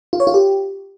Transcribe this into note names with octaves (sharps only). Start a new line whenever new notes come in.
F4
C#5
F4
G4